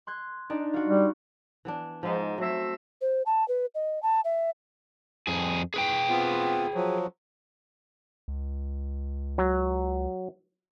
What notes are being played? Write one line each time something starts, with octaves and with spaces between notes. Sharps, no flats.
C6 F#6 G#6
D4 D#4 D5
F4 F#4
G3
E3 B3 D4
G#2 F3 D#4
F#3 A3 C4 E5
C5
A5
B4
D#5
A5
E5
F2 G#4
G#4 B4 G5
B3 C4 F4
F3 F#3
C#2
F#3